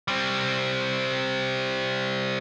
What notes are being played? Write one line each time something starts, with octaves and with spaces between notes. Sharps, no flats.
G3 C4